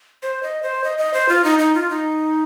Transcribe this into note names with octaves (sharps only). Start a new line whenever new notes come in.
C5
D#5
C5
D#5
D#5
C5
F4
D#4
D#4
F4
D#4